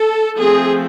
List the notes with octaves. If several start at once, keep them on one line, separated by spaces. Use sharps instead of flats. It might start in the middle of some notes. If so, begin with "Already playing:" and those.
Already playing: A4
F3 A3 C4 G#4